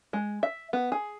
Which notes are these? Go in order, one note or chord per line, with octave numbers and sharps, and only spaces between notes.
G#3
E5
B3
G#4